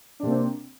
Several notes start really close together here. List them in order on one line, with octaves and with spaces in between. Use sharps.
D4 C3 A#3 C4